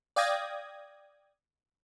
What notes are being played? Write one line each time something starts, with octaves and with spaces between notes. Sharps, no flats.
D5 F5 G5 D#6 G#6 A#6